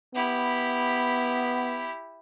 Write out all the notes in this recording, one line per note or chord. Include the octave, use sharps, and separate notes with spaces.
B3 E4 G4